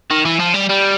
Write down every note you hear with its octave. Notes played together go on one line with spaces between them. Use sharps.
D#3
E3
F3
G3
G3